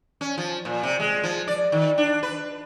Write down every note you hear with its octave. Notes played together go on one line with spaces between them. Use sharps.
C#4
F3
A#2
C3
G#3
F3
D5
D#3
D4
B4